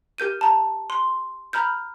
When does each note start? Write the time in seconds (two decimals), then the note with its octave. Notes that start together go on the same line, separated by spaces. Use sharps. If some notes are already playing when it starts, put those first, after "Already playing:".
0.18 G4 A#4 G6 D#7
0.41 A5 A#5
0.90 C6
1.53 A#5 B5 F6 G6